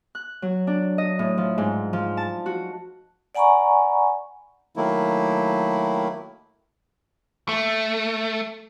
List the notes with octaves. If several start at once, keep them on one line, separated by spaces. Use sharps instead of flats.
F#6
F#3
D4
D#5
A2
F3
G#2
F3
A5
F#4
D5 F#5 G#5 A#5 B5 C#6
D#3 F#3 A3 A#3 E4
A3